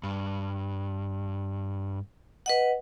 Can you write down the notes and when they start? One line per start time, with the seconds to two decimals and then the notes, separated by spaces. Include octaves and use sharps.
0.03 G2
2.46 B4 D#5 F#5